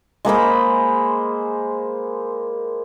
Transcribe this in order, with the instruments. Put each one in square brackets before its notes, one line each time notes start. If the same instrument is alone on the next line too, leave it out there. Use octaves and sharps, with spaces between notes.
[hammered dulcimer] G#3 A#3 C5 B5